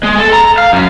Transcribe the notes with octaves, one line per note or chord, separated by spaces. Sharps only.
G#3
A4
A#5
F5
F#2